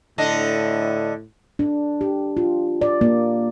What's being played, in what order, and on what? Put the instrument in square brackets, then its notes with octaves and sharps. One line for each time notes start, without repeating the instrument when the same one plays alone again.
[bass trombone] A2 [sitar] D3 D4 D#5
[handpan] D4
G4
F4
D5
A#3